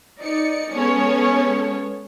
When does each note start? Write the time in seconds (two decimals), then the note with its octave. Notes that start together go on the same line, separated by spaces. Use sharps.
0.20 D#4 D5 C#7
0.72 G#3 B3 C#4 G#4 A4 C#5